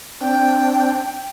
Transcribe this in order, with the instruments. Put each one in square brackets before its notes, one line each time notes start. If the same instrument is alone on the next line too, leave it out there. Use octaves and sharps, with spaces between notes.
[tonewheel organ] C4 D4 [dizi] G5